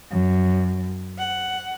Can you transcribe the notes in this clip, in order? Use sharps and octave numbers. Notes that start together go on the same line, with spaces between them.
F#2
F#5